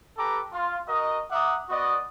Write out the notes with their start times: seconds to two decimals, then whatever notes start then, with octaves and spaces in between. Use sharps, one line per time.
0.17 G4 A4 B4 A#5 D6
0.53 F4
0.88 F#4 A#4 D#5
1.31 E5 F#5 A#5 D6 D#6
1.69 B3 F#4 D5 D#5